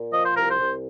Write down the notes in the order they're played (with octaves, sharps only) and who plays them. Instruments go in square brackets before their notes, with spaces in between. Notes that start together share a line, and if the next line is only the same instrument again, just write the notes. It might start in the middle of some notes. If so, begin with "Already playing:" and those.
Already playing: [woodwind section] A#2
F3 D#5
C5
C2 A#4
C5
C2